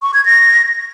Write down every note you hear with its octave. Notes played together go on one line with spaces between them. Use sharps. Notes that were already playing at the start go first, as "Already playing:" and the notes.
C#6
G#6
A#6